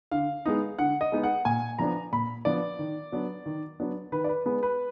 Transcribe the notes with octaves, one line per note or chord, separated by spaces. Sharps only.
D3 F5
G#3 B3 D#4
D3 F#5
D#5
G#3 B3 D#4
F#5
A#2 G#5
F3 B3 D4 A#5
A#2 B5
F3 B3 D4 D5
D#3
F#3 B3 D4
D#3
F#3 B3 D4
D#3 B4
D5
B4
G#3 B3 B4
B4